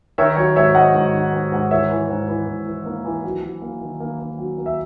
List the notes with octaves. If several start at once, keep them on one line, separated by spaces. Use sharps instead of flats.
D#3 C#5 E5
F#3 C#5
G#2 C#5 E5
G#2 D#5 F#5
G#2
D#3
G#2
G#2
E3 C#5 E5
E3
G#2
E3
G#2
E3
A#3
E3
F#3
F#3
A#3
D#3
A#3
A#3
F#3
A#3
E5